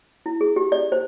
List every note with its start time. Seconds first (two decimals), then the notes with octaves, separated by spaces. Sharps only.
0.26 E4
0.41 G#4
0.56 G4
0.72 D5
0.92 C5